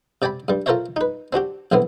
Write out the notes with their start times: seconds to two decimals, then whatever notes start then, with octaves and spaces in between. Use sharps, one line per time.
0.22 C3 D5 G5 G#5 B5
0.48 G2 G3
0.66 F4 A4 A#4 C5 C#5 E5
0.96 D#4 B4
1.33 C4 D4 F#4 G4
1.72 A#1 D3 E3 B3 C4